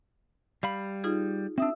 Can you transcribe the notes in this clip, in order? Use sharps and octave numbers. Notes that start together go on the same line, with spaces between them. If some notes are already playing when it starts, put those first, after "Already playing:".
G3 F5 B5
D#4 F4 G#4
C4 D4 E5 D#6 E6